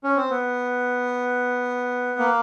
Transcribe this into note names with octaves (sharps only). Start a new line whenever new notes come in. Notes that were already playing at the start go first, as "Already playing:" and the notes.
C#4
C4
B3
A#3